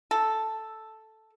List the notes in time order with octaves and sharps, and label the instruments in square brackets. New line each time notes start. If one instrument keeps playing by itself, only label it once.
[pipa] A4